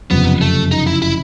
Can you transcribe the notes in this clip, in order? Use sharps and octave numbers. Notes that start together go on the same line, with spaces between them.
F#1 F2 C3 B3
A3
D#4
E4
E4